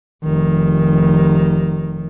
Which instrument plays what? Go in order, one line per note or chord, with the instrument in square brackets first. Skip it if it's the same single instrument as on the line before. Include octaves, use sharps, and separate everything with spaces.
[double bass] F1 D#3